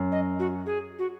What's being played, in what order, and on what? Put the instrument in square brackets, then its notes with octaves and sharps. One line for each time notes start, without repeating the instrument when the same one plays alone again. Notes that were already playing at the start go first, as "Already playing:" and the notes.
Already playing: [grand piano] F#2
[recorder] D#5
F#4
G#4
F#4